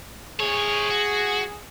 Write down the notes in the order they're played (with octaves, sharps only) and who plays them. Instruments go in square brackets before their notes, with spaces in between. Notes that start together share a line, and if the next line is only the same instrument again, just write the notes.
[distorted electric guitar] C3 C#5 [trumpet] G#4
[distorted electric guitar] F#4